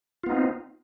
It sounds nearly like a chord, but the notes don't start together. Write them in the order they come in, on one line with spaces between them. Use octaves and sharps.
F4 B3 D#4 C4